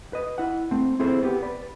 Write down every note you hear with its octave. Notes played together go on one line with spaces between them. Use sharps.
B4 D#5
E4 F#5
A3 C4
C4 E4 G#4 A4 C5
B3 G4
B4 D5